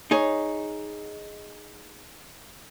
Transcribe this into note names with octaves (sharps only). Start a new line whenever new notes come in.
D#4 G#4 C#5